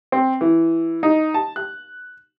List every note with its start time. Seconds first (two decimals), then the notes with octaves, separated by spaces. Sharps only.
0.12 C4
0.41 E3
1.03 D#4
1.34 A5
1.56 F#6